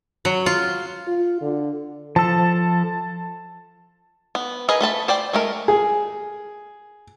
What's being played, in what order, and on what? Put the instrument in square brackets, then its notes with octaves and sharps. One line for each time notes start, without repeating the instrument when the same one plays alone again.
[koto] F#3
F4
[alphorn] F4
D3
[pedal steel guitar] F3 A4 [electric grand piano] A5
[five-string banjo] B3
G#4 A#4 B4 D#5 G#5
A3 A4 A5 B5
C5 D5 G5
G#3 A3 A#4
[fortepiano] G#4